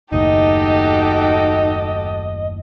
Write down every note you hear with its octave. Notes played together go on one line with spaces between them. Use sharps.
F#1 D#2 A2 D#4 F#4 G4 A4 D#5